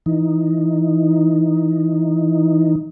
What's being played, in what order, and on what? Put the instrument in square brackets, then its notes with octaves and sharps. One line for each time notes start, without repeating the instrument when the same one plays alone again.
[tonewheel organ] E3 D#4